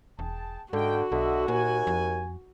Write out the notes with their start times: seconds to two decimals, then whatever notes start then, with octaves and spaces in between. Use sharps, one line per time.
0.19 E1 G#4 G5 A5
0.73 G#2 D3 F#4 D#5 F5 G5
1.12 B1 D3 D#5 E5
1.48 D#2 A#2 G#5
1.87 F2